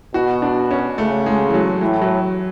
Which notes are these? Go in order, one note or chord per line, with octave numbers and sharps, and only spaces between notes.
B2 F#4
D4
C#4
C#3 A3
G#3
E3
F#3
A2 E3
F#3